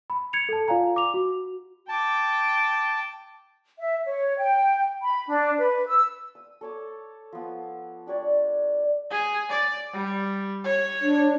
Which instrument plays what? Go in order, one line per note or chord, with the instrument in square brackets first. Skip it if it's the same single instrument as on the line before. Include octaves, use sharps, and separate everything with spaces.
[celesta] B5
G#6 C#7 F7
A4 A5
F4 D5 F5 G#5 A#5
D6 F7
F#4
[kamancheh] G5 D6 [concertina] A5
[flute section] E5
C#5
G5
B5
D4
B4
E6
[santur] D#6
A4 C#5 D6
F3 B3
D4 G4 C#5 D5
[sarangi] G#4
D5
G3
C#5
[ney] D4